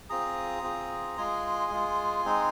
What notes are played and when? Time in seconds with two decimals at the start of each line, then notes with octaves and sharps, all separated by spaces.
0.10 C4 F4 G#4 A#5 D#6
0.63 C4 F4 G#4
1.18 G#3 F4 G#4 G#5 C6
1.71 G#3 F4 G#4
2.25 G#3 C4 D#4 G#4